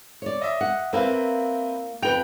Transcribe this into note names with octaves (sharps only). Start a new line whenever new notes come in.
C#5 D5
D#5 E5
F#5
A#3 C4 E4 A#4 B4 F5
F2 B4 G5 G6 D7 F7